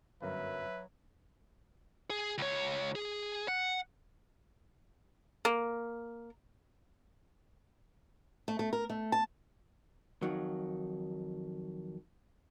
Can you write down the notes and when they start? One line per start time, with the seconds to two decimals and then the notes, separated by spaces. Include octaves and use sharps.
0.22 G1 F#2 F#3 A#4 B4 E5
2.10 G#4
2.38 C#2 C#5
2.95 G#4
3.48 F#5
5.45 A#3
8.48 A3
8.59 A3
8.73 A#4
8.90 A3
9.12 A5
10.22 F2 D#3 F#3